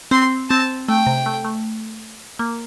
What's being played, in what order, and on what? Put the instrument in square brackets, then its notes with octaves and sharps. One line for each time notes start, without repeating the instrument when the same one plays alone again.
[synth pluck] C4 [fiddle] C6
[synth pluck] C4 [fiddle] A5
[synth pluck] A3 [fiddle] G5
[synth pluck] C3
A3
A3
A#3